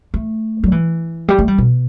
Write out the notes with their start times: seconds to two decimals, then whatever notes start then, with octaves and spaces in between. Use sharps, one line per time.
0.14 A3
0.64 F#3
0.72 E3
1.28 G3
1.39 A3
1.48 G3
1.58 B2